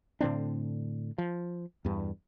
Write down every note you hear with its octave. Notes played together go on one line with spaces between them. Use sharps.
A2 D3 C4 D4
F3
E2 G2